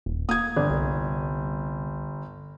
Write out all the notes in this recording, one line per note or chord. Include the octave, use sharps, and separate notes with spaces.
D#1
A#3 D#6 G#6
G1 D4
C2